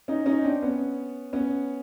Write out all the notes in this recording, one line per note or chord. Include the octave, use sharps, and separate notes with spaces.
C#4 D#4
C#4 D#4
C4 D4
B3 C#4
B3 C#4